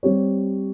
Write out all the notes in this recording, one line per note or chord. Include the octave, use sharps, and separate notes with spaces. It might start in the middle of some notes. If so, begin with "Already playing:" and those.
G3 C4 G4 C#5